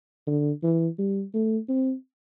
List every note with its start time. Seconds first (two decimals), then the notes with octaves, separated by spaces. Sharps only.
0.27 D3
0.63 E3
0.99 G3
1.34 A3
1.69 C4